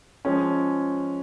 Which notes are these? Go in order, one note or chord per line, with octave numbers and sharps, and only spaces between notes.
F3 G#3 C#4